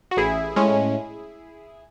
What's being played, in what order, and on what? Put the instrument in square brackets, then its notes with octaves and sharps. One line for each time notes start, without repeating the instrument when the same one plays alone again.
[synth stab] F#4
A1 E4 G#4
A2 G#3 C#4